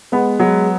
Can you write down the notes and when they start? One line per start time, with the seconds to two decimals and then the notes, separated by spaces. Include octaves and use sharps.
0.12 G#3 B3
0.40 F#3 G#3